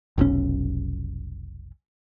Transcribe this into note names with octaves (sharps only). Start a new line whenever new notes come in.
F1 B1 G#2 C#4